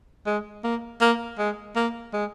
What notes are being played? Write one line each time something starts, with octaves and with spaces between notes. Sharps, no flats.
G#3
A#3
A#3
G#3
A#3
G#3